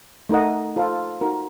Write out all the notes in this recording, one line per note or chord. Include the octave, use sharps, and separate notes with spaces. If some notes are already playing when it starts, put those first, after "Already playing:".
A3 D#4 A#4 D#5 F#5
F4 A4 C5 F5
D#4 F#4 A#4